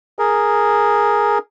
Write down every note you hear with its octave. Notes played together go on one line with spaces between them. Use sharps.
G#4 A#4